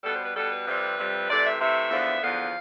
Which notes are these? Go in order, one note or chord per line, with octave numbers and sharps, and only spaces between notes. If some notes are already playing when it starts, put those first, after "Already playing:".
B2 G3 B3 A4
C5
B4
B2 G3 B3 A4
B4
F2 C3 G3
F2 C3 G3
C3 E3 A3 D5
E5
C3 E3 A3 E5
E2 D3 F3 B3
E2 D3 F3 B3 F5